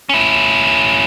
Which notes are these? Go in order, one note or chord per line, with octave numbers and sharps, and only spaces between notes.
C#4 E4